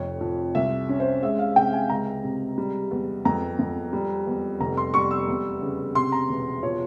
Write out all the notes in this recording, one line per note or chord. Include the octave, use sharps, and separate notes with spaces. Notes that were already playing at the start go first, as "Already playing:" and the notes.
Already playing: F1 F2 C#5
F3
C2 E5
C#4
C5
G#3 E5
F5
C3 G5
G#5
C#2 A#5
C3
G3
E2
F2 A#5
F2
G3
E2
F1 A#5
C6
G3 C#6
E6
E2
C#3
C3 C6
A#5
E1
F3 C#5